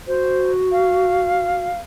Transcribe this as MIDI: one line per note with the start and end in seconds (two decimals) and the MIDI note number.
0.07 1.67 66
0.07 0.51 72
0.72 1.80 77